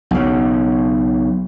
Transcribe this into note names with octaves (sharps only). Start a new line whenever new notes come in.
B1 C#3